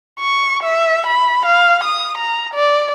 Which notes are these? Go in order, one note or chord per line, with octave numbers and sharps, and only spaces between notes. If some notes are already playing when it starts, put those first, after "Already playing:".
C#6
E5
B5
F5
D#6
A#5
D5